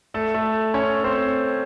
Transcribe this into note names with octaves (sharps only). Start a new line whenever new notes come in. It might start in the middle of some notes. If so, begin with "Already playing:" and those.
A3 A4
A3 A4
C#4 C#5
C4 C5